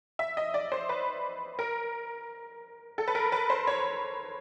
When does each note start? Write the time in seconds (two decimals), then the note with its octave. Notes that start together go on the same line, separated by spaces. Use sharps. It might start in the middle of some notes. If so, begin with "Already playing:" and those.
0.19 E5
0.37 D#5
0.54 D5
0.72 C5
0.89 B4
1.59 A#4
2.98 A4
3.08 B4
3.15 A#4
3.32 B4
3.50 C5
3.67 C#5